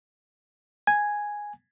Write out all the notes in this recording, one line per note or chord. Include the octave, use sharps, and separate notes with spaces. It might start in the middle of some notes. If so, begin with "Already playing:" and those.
G#5